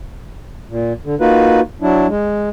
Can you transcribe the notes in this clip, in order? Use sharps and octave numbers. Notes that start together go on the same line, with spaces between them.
A#2
D3
A#3 D#4 F4 F#4 B4
F#3 D4 E4
G#3